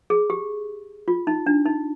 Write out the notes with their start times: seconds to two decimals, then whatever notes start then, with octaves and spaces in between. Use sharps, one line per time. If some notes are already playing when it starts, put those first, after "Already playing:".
0.10 G#4
0.30 G4
1.08 F4
1.27 D#4
1.46 D4
1.65 D#4